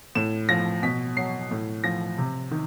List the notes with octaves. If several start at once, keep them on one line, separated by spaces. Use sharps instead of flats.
A2 E7
F3 A#6
B2 B6
F#3 C7
A2
F3 A#6
C3
D#3